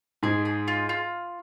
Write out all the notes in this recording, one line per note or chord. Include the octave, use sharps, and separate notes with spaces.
G#2 G#4
G#4
F4
F4